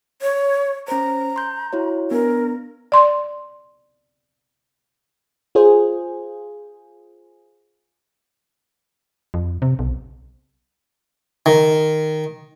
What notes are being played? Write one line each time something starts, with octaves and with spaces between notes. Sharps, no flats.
C#5
C#4 C5 A#5
C6 G6
E4 F#4 C#5
B3 D4 A#4
D5 C6
F4 G#4 C5
F2
C3
B1
D#3